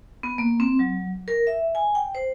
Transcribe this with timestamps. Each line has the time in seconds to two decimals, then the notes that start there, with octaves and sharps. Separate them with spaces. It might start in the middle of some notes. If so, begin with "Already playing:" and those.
0.23 B3
0.38 A#3
0.60 C4
0.79 F#3
1.28 A#4
1.47 E5
1.75 G#5
1.95 G5
2.15 C5